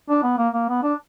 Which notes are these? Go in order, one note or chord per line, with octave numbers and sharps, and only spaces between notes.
D4
B3
A#3
A#3
B3
D4